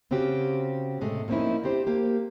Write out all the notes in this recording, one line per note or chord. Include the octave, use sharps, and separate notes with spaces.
C#3 C4 C#4 F#4 G4
A2 C3 G#3 A3
F3 A#3 C4 C#4 D#4 E4
C4 D4 G4 C5
A#3 G4